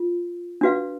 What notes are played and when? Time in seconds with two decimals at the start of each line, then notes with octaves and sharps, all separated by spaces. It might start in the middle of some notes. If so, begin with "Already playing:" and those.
Already playing: F4
0.61 D4 F#4 B4 F5